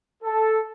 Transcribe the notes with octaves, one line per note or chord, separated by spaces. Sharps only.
A4